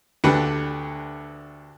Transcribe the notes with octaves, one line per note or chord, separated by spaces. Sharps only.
D2 D3 G4 B4